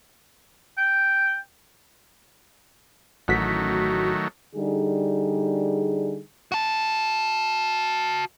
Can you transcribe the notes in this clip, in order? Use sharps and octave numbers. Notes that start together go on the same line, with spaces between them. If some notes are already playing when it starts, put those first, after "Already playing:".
G5
A1 D#3 F#3 A3 F#4 B6
D3 G3 D#4 G#4
F#4 A5